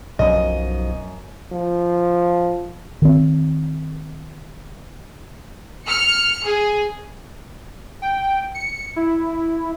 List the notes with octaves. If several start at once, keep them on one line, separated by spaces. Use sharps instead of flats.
B1 F#2 B2 F3 D#5
F3
D#3 C4
F6 C#7
G#4
G5
C#7
E4